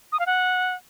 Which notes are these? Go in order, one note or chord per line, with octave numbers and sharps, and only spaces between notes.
D#6
F5
F#5